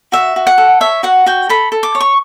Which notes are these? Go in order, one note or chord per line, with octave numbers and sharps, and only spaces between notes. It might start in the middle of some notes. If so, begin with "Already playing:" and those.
F#4 E5
F#4
F#5
A4
C#5 E5
F#4 F#5
F#4 G5
A4 B5
A4
D6
C#5
C#6